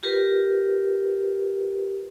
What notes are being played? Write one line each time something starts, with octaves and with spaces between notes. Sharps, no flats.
F4 G4 A#4 B4